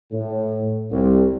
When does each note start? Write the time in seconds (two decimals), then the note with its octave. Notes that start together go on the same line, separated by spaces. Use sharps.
0.12 A2
0.91 C2